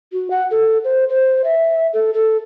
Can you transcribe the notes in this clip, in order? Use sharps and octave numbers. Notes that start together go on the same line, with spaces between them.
F#4
F#5
A4
C5
C5
E5
A4
A4